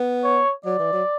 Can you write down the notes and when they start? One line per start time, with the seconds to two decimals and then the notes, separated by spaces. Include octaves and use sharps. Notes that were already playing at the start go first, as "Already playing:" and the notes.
Already playing: B3
0.24 C#5
0.65 F#3 D5
0.79 E3
0.93 F#3